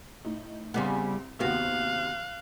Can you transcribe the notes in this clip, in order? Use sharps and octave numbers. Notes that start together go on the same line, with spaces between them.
A2 D#4
C2 C#3 G3 B3 C4 C6
D#2 C3 B3 C4 F#4 F5 F#6